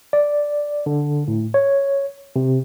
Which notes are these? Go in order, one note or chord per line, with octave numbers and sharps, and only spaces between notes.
D5
D3
A2
C#5
C3